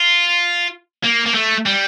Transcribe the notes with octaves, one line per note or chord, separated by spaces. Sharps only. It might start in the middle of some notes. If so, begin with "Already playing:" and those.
Already playing: F4
A#3
A#3
A3
G3